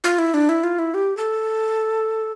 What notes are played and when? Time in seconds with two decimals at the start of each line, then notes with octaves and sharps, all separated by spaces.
0.04 F4
0.19 E4
0.34 D4
0.49 E4
0.64 F4
0.79 E4
0.94 G4
1.17 A4